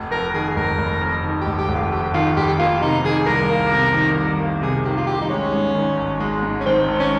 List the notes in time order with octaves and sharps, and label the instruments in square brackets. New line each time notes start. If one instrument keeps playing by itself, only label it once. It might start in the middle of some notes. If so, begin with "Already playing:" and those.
Already playing: [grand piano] F1
[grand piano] F2 [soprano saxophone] A#4
[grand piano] D#3 [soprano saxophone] G#4
[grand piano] F1 [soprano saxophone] A#4
[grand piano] F1
F2
D#3
[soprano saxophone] G4
[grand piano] F1
[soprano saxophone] G4
[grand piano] F1
[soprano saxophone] F4
[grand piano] F2 [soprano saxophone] G4
[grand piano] D#3 [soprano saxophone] F4
[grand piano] F1 [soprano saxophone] G4
[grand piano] A#3 [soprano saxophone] F4
[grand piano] C3 [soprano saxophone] D#4
[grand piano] D#3 [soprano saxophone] G#4
[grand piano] C2 [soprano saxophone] A#4
[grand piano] A#3
C3
D#3
C2
A#3
[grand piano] C3 [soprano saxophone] G#4
[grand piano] D#3 [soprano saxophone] G4
[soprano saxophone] F4
[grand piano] C2 [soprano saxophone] G4
[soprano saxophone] D#4
[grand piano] G#3 [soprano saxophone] C#4
[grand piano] G#2
D#3
G#1
G#3
G#2
[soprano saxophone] C#4
[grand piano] D#3 [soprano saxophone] C4
[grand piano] G#1
[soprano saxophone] C#4